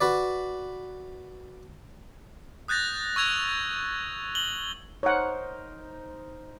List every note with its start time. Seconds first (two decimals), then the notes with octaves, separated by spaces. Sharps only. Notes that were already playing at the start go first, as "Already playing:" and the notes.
0.01 F#4 B4 D5
2.68 D#6 F#6 G6 A6 A#6
3.16 C#6 E6 G#6 F7
4.35 F#7 G7
5.03 D#4 A#4 C5 C#5 F#5